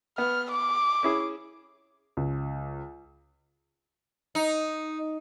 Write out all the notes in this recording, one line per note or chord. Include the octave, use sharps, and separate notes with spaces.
B3 F6
D6
C#4 E4 G#4
C#2
D#4